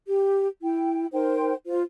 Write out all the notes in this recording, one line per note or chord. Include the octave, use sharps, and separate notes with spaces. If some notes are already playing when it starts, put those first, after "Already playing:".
G4
E4 G5
D#4 A#4 C5 G5
F4 C5